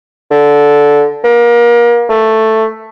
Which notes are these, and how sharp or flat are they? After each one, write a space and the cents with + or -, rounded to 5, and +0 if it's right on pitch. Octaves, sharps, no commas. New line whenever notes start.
D3 -10
A#3 +30
A3 +5